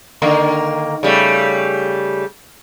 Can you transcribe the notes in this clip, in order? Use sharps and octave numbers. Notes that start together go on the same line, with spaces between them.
D3 D#3 A#3
C#3 G3 A3